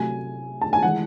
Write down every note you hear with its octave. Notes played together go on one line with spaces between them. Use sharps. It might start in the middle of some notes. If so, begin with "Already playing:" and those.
Already playing: C3 F#3 A3 G#5
A5
G#5
E3 G#3 F#5